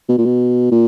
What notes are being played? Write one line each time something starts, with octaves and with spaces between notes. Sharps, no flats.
B2
A#2
B2
A#2